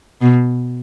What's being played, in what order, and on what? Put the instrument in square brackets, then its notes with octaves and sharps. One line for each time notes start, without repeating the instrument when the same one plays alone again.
[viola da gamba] B2